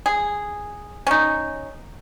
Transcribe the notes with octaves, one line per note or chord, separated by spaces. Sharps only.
G#4
C#4 D#4